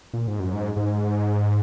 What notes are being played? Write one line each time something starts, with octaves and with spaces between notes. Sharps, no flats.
A#2
G#2
F#2
G#2
G#2